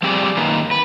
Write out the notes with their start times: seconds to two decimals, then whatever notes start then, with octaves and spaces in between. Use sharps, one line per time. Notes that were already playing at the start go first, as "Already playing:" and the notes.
0.02 F3 G3 C4 G4 G#4 D5
0.37 F#2 D#3 A#3 B4
0.71 B4